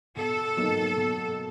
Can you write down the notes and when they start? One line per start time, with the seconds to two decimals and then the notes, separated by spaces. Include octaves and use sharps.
0.16 B2 A4
0.57 F#3 A#3 D#4
0.97 B2